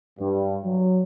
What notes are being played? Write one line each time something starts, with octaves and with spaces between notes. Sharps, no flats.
G2
F#3